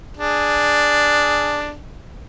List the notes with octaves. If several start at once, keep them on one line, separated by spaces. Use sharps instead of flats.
D4 G#4